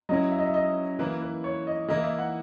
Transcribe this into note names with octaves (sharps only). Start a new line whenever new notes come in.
F#3 C#4 E4 D#5
E5
D#5
E5
D#5
E3 A#3 E4 B4
B4
C#5
D#5
E3 A#3 E4 D#5
E5
F#5